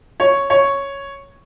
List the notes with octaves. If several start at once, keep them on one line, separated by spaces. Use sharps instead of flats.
C#5
C#5